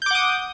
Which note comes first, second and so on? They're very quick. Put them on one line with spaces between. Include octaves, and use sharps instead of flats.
G6 D6 F#5 D#6